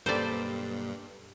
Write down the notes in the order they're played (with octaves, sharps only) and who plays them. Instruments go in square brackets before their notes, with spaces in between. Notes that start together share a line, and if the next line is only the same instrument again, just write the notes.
[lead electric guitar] B1 A#3 [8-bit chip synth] G2 [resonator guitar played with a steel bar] G4 A4 B4 [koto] C5 D5